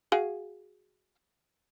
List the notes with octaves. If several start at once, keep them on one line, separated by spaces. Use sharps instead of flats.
F#4 G#4 F5